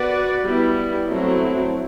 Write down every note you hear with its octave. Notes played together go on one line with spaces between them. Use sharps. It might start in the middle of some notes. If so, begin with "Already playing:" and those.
Already playing: B3 F#4 B4 D5
G3 B3 E4
F#3 A3 C4 E4